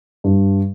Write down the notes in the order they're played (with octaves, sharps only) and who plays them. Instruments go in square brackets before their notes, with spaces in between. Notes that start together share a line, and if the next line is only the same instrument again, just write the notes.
[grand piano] G2